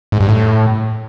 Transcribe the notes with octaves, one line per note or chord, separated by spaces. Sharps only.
G#2
G2
A2